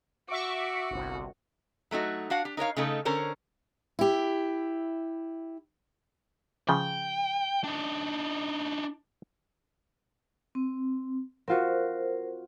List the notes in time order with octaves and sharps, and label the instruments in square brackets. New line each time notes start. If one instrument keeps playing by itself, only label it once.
[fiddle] F#4 [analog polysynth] E5 C#6 D6
[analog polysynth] G1 C2
[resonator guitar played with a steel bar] F#3 A3 D#4 F#4
D4 F#4 F5 F#5
G4
D#4 A#4 C#5 F5
C#3 A3 D#4 A4
D3 C#4 A#4 C5 C#5
[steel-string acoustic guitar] E4 G4
[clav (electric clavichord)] C#3 F3 [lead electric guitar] G5
[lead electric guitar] D4 D#4
[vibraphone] C4
[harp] C4 F4 F#4 [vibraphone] A#4 C5